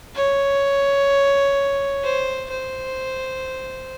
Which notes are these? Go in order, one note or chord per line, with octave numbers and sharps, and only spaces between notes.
C#5
C5
C5